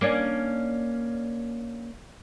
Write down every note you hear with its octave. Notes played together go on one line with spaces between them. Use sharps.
A#3 C#4 D4